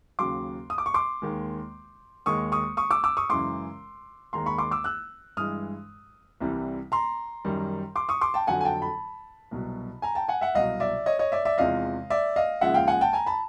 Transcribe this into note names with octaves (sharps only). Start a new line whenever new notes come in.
D#2 C#3 F#3 C6 D6
D#6
D6
C#6
C6 D6
D#2 D#3 G#3
D#2 D#3 G#3 C#6 D#6
C#6 D#6
C#6 D#6
D6 E6
D6 E6
C#6 D#6
F#2 C#3 E3 G#3 C6 D6
D#2 D#3 G#3 A#5 C6
B5 C#6
C6 D6
D6 E6
E6 F#6
G2 E3 G#3 D#6 F6
C2 C3 E3 G3
A#5 C6
F#2 D#3 G3
C6 D6
C#6 D#6
C6 D6
G5 A5
F2 D3 F#3 F#5 G#5
G#5
G5 A5
A5 B5
C2 B2 F#3
G#5 A#5
G5 A5
F#5 G#5
E5 F#5
C2 B2 F#3 D#5 F5
D5 E5
C#5 D#5
C#5 D#5
D5 E5
D5 E5
E2 C3 F3 G#3 D#5 F5
D5 E5
D#5 F5
D#2 C#3 F3 G#3 E5 F#5
F5 G5
F#5 G#5
G5 A5
G#5 A#5
A5 B5